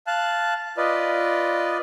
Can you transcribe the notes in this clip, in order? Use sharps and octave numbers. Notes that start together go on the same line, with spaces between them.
F5 A5 F#6
F4 B4 D5 D#5